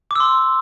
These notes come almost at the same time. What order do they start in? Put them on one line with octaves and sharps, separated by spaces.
D6 E6 C6